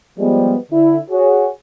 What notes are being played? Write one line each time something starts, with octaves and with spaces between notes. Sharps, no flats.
F3 G3 G#3 B3
D3 E4
F#4 G#4 C#5